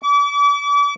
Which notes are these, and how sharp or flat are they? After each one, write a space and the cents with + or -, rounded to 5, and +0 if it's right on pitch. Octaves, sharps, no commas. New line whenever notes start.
D6 -40